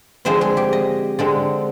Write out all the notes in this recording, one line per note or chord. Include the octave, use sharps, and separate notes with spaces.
D3 F3 G#3 C4 C5
G#4
G4
D#5
D3 G#3 C4